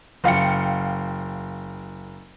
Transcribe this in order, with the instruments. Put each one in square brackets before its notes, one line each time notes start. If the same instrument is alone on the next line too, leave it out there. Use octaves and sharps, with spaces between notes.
[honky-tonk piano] F#1 F5 G5 C#7